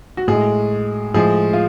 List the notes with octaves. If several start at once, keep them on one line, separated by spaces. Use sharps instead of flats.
F#4
A2 G#3 G#4
A2 F3 G#3 G#4
F4